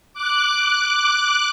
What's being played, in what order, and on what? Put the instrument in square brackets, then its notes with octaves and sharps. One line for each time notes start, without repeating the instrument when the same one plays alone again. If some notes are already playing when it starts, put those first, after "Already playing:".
[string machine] D6 F#6